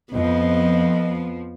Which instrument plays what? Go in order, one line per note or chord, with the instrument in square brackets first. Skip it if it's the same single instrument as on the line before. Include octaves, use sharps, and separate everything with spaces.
[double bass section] F2 [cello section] F3 [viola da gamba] B3 [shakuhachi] D#5